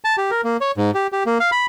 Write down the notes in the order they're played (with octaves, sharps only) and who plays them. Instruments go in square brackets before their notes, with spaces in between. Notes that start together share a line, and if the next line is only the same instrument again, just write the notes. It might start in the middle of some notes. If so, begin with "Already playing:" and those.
[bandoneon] A5
G4
A#4
A#3
C#5
G#2
G4
G4
A#3
F5
B5